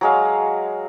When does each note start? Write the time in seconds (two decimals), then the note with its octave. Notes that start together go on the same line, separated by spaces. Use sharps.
0.01 F#3 G#3 F5